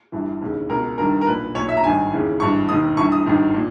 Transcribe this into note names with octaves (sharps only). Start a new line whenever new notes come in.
G1 G2 E3
E1 D#2 C#3
C#2 B2 A#4
G1 G2 D#3 A#4
A#4
B1 A#2 B4
B1 A#2 C#5
E5
A#5
G#1 G2 D#3 G#5
D#2 C#3 E3
G#1 G2 E3 C#6
E1 D#2 D#3 D#6
G1 G2 E3 C#6
D#6
G#1 G2 D#3
A#2